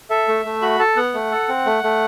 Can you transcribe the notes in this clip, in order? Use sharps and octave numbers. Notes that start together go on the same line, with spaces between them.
A4 E5
A3
A3
F#4 B5
A4 A5
B3 F#5
A3
A4
C4
A3
A3